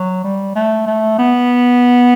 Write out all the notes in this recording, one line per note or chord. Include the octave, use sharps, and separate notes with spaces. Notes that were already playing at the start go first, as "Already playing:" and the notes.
Already playing: F#3
G3
A3
A3
B3